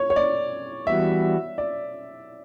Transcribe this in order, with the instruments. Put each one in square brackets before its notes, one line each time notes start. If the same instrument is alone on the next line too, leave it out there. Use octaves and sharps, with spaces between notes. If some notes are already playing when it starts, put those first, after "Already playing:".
Already playing: [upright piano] C#5
C#5
D5
[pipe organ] E3 G3 B3 F#4 [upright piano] E5
[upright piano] D5